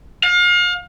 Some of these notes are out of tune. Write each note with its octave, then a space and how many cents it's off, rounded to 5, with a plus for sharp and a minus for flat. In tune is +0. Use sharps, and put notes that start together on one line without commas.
F5 +35